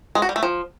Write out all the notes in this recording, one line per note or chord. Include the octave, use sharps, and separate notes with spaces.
G#3
F#4
G3
A3
F3